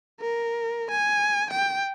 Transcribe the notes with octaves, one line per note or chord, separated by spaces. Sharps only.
A#4
G#5
G5